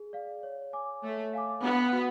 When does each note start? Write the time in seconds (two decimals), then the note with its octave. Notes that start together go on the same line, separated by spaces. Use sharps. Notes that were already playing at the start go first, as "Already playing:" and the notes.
Already playing: G#4
0.13 D5 F5
0.43 C#5
0.73 G#5 D6
1.03 A3 C#5
1.33 F5 G#5 D6
1.62 B3 D4
1.93 F#4 B4